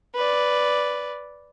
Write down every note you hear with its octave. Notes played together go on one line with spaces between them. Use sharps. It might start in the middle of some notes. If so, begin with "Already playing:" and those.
B4 D5